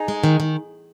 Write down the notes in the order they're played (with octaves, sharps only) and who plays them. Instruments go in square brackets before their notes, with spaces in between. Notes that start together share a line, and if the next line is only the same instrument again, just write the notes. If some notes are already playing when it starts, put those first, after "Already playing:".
Already playing: [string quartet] D#4 G#4
[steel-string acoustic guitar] G#3
D#3
D#3